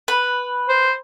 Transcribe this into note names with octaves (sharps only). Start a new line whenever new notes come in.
B4
C5